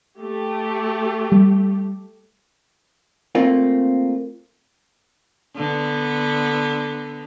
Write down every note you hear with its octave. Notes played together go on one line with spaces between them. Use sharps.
A3 G4
G3
A3 A#3 C4 F4
D3 B3